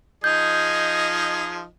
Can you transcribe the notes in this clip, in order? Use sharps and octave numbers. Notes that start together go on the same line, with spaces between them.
F3 D#4 G#4 D#5 G6